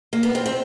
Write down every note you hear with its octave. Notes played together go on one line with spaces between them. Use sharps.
A#3
B3
C4
C4